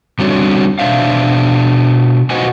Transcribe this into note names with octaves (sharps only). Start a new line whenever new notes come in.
D3 G3 C4 D4 F#4 C#5
B2 D4 C5 E5 F5
F#4 B4 C5 D#5 F#5 G#5